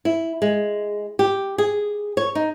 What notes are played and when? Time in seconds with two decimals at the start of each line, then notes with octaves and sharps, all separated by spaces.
0.05 E4
0.42 G#3
1.19 G4
1.58 G#4
2.17 C#5
2.35 D#4